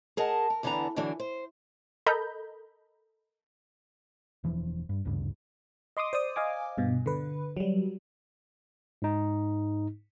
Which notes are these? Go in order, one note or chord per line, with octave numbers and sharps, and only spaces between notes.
G#4 A#4 D#5 F#5 A5
A#4
E2 D3 E3 B3 D4 A#5
E2 D3 E3 F#3 D4
C5
A4 A#4 D#5 A#5 B5 G6
E1 E3 F3
G2
G#1 D2 G2 C#3
D#5 C6 D6 D#6
C5 D5 D#6
D#5 F5 G#5 D6
G2 B2
D3 B4
F#3 G3
G#2 D#4